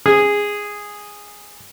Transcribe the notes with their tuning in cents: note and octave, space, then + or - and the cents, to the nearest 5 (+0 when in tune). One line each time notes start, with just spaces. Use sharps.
G#4 -10